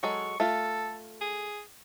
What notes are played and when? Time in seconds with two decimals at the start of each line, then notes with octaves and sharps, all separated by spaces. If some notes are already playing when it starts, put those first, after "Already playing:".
0.03 F#3 G#3 A4 C#6
0.40 A3 F4 A4
1.21 G#4